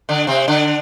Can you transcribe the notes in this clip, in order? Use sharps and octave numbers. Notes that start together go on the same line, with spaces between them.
D3 D4
C3 C4
D3 D4